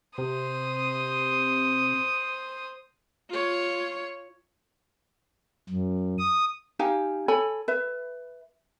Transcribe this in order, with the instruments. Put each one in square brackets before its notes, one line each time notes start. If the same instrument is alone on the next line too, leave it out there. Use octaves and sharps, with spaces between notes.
[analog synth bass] C3 [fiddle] C5 D#6
[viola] F4 C#5
[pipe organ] F#2
D#6
[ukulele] D#4 G4 F5 G#5
A4 C#5 G#5 B5
B4 E5